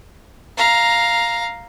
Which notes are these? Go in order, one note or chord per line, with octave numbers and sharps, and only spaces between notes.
F5 A#5